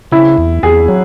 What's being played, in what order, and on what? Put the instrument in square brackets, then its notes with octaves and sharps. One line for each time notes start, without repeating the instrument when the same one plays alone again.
[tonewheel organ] C#3 [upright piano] E4
[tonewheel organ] E2
[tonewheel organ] E2 [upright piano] G#4
[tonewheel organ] F#3